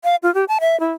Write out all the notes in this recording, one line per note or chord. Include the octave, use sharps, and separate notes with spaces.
F5
F4
G4
A5
E5
E4